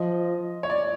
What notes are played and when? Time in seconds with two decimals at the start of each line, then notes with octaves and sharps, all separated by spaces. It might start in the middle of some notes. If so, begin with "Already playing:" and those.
Already playing: F3 D#5
0.63 C#5
0.70 D5